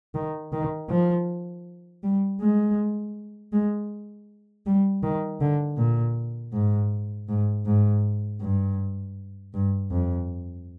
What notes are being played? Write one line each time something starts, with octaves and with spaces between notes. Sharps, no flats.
D#3
D#3
F3
G3
G#3
G#3
G3
D#3
D3
A#2
G#2
G#2
G#2
G2
G2
F2